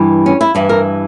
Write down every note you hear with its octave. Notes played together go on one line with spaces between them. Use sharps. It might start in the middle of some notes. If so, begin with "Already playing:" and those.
Already playing: G2 E3 G3
C#4
E4
G2 E3 G3
A#4